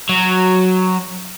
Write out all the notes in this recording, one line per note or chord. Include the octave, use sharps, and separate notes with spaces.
F#3